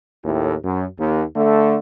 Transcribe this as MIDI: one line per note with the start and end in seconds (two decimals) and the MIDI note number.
0.24 0.54 39
0.24 0.54 45
0.64 0.85 42
0.99 1.24 39
1.36 1.78 50
1.36 1.78 57